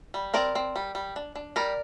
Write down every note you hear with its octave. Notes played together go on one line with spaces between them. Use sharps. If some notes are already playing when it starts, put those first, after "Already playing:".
G3
C4 A#4 D5
C4
G3
G3
D4
D4
G3 A#4 D5